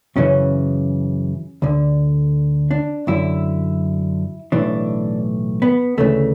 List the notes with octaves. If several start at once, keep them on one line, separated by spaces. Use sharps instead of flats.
F#2 C#3 E3 C#4
D2 D3
D4
F#2 D3 E4
B1 A2 E3 D4
B3
D2 C#3 E3 A3